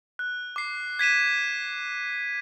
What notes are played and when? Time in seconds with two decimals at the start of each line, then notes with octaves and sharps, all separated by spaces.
0.19 F#6
0.56 D6 C7
0.99 G#6 B6 D#7 E7